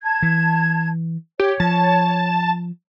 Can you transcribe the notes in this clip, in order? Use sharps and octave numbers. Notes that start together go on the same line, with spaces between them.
A5 G#6
E3
G4 C#5
F3 A5